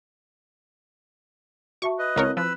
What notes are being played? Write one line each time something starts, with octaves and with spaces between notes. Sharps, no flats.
F#4 E5 A5 C#6
B4 D#5
C#2 C4 E4 A#4 C#5 F5
F3 B4 B5 E6